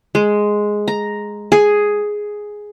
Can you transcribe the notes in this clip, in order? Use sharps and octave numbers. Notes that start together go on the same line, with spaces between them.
G#3
A#5
G#4